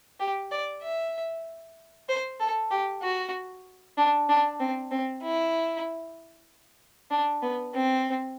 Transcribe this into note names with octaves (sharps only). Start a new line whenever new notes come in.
G4
D5
E5
C5
A4
G4
F#4
D4
D4
C4
C4
E4
D4
B3
C4